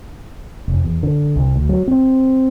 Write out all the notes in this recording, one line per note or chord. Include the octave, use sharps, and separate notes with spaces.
F1
E2
D3
C2
D2
F#3
C4